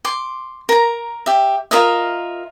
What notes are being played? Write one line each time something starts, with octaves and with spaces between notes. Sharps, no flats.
C6 D6
A#4 A#5
G4 E5
F4 A#4 D#5 E5